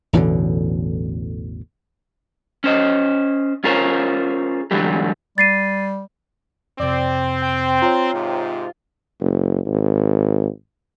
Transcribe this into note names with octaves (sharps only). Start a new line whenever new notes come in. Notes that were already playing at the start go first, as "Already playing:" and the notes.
A1 E2 B2 D3
C#4 C5 D#5
C#4 F4 G#4 A#4 C5 C#5
G#2 D3 E3 F#3 G3 G4
G3 A6 C7 D#7
F2 C3 C4 D5
G5
F4 C#5 G5 A#5
G#2 C3
F#1
G#1